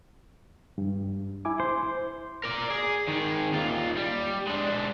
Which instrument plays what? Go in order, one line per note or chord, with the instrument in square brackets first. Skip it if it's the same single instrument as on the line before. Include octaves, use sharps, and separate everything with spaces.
[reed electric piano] G2
E4 G#5 D6
[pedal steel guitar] C5
[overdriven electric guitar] A#4 D5
G#4
D#3 G#4
D#2 F4
G3
G#3 D4